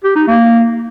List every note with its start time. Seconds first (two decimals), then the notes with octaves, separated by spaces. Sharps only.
0.04 G4
0.15 D#4
0.27 A#3